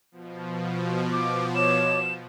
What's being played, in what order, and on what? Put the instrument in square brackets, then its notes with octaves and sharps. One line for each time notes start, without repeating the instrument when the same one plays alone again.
[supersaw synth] B2 F3
[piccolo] D6
[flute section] C#5 D6 [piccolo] E7